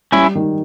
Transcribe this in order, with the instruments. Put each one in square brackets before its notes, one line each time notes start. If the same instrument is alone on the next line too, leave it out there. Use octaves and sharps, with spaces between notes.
[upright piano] G3 [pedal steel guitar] C#4 E4
[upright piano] D#3